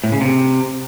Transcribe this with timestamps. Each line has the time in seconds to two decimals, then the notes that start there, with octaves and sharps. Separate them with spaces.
0.04 A2
0.12 C#3
0.21 C3